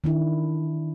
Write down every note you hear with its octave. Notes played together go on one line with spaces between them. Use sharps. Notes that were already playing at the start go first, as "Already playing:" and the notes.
D#3 D4 E4